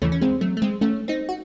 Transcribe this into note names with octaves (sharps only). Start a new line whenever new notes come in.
D#2 C#3 E3 A3 C#4
C#4
G#3 C4
F#3 A3
A3
G#3 C4
A3 C#4
C4 D#4
F#4